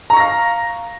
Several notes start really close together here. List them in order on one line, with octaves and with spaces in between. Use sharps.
A#5 C#6 A#6 F5